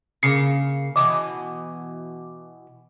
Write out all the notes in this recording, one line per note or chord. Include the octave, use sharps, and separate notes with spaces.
C#3 A#3 C7 C#7
B2 E3 D#5 D6